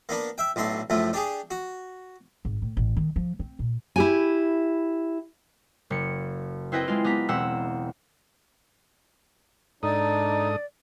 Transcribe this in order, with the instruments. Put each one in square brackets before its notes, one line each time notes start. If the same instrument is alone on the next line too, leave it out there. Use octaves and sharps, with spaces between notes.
[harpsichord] A#3 B3 D4
E5 G5
B1 A2 D4 C6
F#2 A2 F3 A3
D4 G4 G#4
F#4
[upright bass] G#1
A2
A1
D#3
F3
C4
A#2
[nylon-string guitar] E4 G4 G#5
[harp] F#1 C#7
C4 E4 B4 D#5 G5
G#3 F4
B3 G4 A#5 B6
E1 C4 F#5 E6
[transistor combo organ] G#2 A4 D#6 [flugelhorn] D4 [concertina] D#4 [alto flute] D5